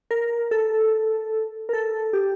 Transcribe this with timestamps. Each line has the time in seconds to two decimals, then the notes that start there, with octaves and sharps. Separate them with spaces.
0.11 A#4
0.51 A4
1.69 A#4
1.73 A4
2.13 G4